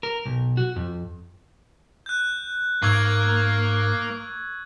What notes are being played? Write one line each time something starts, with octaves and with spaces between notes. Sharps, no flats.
A#4
B1
F#4
F2
F#6 G6
G#2 A#3 C#6 E6 G#6